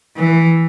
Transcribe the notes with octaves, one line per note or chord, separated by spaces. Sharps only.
E3